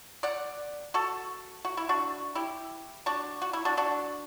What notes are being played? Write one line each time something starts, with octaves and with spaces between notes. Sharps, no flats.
D5 F#5
F#4 A4
F#4
E4
D4 F#4
E4 G4
D4 F#4
F#4
E4
D4 F#4
D4 F#4